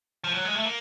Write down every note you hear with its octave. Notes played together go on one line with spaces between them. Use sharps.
F3
F#3
G#3
A3
A#3